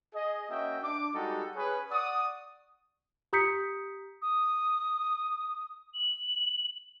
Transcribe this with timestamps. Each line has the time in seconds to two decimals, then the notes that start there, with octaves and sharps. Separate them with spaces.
0.14 G#4 D#5
0.49 A#3 C#4 F#4 D#5 E5 G5
0.82 D4 D6
1.14 G3 G#3 D#4 F#4 G4 A4
1.55 C#4 G#4 B4
1.91 D5 F#5 C#6 D#6
3.33 G4 A#5 D#6 G6 B6 C#7
4.22 D#6
5.94 F#7